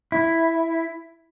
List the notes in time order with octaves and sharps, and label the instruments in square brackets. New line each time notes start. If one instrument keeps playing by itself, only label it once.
[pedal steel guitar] E4